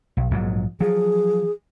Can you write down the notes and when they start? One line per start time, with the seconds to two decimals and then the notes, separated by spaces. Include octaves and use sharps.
0.17 B1
0.31 A#1 G#2 F#3
0.81 F3 F#3 G#4